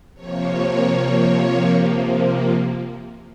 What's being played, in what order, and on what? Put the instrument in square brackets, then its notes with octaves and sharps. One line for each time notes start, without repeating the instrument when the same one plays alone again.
[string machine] C3 F3 A#3 C#5